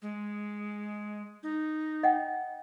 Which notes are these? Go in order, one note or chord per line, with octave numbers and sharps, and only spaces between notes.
G#3
D#4
D#5 F#5 G5